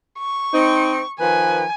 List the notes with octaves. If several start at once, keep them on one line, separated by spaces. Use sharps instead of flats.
C#6
C4 D#4
D#3 F3 B4 G#5